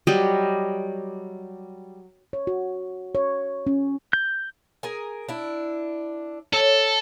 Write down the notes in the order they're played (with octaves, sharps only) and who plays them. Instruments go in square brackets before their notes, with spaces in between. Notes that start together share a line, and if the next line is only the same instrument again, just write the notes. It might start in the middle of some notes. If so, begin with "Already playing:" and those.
[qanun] F#3 G3 D#5
[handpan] C#5
F#4
C#5
C#4
[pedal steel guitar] G6
[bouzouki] G#4 A#4 G#5
D4 E4
[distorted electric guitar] A4 [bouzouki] C#5